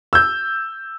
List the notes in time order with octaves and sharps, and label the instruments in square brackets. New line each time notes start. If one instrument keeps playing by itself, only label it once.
[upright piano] E6 G6